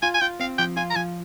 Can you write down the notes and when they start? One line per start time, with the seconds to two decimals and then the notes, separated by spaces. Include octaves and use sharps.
0.02 F4 G#5
0.14 G#5
0.21 F4 G5
0.40 C4 F5
0.58 F3 G5
0.77 F4 G#5
0.90 A#5
0.96 F3 G#5